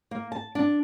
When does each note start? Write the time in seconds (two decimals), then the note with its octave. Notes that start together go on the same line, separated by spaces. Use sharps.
0.11 A#3
0.32 A5
0.55 D4